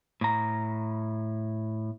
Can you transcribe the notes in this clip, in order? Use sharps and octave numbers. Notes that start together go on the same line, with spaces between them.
A2 A#5